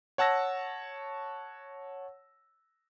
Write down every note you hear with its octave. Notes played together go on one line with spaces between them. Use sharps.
C#5 F#5 A5 E6 A#6